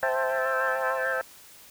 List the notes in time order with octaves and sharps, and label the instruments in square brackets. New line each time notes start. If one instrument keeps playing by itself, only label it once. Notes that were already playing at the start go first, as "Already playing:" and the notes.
[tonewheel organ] C5 E5 G5 A5